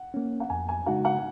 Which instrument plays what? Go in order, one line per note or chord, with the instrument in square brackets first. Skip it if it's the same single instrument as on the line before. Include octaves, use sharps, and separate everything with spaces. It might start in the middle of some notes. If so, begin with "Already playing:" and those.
Already playing: [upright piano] F#5
[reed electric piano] A#3 C#4
[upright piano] F#5
[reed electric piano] F2 [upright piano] G#5
[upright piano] G#5
[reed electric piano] C#3 G#3 D#4 F#4 [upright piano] F#5
[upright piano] F#5